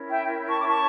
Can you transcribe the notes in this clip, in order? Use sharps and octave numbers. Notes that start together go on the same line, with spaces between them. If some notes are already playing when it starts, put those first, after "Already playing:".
Already playing: C#4 E4 A#4 C#5
E5 G5
A5 C#6
D6
A5 C#6